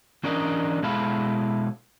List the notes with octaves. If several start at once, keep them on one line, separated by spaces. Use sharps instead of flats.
E3 C#4 D4 A#4 D5 D#5
B2 G#3 E4 A4 F5 B5